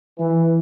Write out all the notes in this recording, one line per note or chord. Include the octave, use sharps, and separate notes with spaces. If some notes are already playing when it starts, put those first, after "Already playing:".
E3